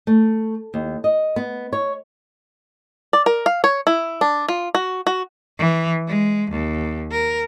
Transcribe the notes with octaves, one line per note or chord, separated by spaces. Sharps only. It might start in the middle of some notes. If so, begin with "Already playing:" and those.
A3
D#2
D#5
B3
C#5
D5
A#4
F5
C#5
E4
D4
F4
F#4
F#4
E3
G#3
D#2
A#4